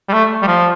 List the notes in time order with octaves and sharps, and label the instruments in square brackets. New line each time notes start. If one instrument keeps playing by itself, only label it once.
[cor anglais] G3
A3
G3
F3